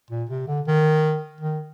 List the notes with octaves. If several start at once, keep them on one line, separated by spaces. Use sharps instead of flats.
A#2
C3
D3
D#3
D#3